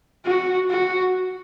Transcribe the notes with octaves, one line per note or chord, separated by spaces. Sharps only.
F#4
F#4